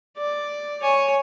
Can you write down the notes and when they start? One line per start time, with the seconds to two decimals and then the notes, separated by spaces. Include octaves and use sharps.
0.17 D5
0.82 C#5 G#5